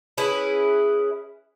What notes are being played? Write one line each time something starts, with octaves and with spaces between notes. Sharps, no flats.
C#4 E4 G#4 B4